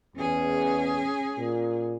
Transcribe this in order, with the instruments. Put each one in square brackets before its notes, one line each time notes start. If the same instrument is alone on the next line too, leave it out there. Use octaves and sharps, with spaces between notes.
[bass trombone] E2 [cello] C#4 G#4
[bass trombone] A#2